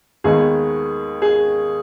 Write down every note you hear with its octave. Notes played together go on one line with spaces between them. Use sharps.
D#2 D#3 G#3 B3 G#4
G#4